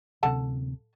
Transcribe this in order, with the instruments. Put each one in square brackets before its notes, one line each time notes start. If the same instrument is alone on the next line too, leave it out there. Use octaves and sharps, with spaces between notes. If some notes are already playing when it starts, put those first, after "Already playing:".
[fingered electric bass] D1 C3 [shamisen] A4 F#5 A5